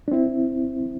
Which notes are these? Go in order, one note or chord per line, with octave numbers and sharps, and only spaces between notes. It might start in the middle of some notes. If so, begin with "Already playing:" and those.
D4
C4 E4